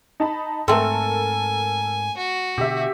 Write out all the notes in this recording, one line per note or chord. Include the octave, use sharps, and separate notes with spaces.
D#4 A5 B5
G#2 A3 C4 A4 A#4 G#5
F#4
B2 D3 G4 E5